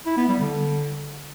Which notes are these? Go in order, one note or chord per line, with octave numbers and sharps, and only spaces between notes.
E4
B3
G3
D3